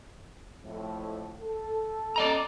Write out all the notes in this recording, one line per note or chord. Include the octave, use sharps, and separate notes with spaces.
F2 A2
A4
D5 D#5 A#5